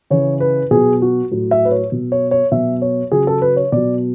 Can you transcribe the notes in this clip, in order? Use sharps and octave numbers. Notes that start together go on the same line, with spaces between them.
C#3 E3 C#5
B4
B2 F#3 G#4
F#4
A2 F#3
E5
B4
C#5
B2 F#3
C#5
C#5
B2 F#3 E5
C#5
C#3 F#3 G#4
A4
B4
C#5
B2 F#3 D5